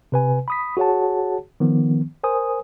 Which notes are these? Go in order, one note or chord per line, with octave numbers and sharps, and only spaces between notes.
C3 B4 G#5
B5 D#6 B6
F#4 G#4 C#5 F#5 A5
D#3 F3 B3
A#4 C5 G#5 D#6